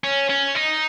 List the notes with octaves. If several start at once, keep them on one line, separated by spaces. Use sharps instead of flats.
C#4
C#4
D#4